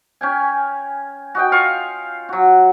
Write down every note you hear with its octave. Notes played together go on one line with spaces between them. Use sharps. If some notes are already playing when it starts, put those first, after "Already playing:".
C#4 G5 G#5
F#4 D#5 G5
F4 F5 C#6
F#3 F#4